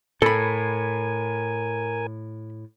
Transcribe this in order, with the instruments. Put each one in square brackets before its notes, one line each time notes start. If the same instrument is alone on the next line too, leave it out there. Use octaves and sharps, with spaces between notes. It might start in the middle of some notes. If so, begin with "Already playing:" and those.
[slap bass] A2 [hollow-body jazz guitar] A4 B5 [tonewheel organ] A#4 G#5